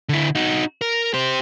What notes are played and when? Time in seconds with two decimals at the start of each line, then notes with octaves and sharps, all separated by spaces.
0.09 D3 E4
0.35 D#4 F#4
0.81 A#4
1.14 G4 C5